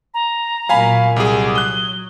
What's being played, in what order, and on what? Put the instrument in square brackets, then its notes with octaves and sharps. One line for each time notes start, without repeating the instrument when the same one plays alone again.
[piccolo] A#5
[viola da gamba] A#2 F#3 A#3 [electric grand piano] F5 G#5 B5
[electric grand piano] C2 G#4 [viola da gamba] F#3 [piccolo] D6
[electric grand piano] D#6 F#6 [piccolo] G7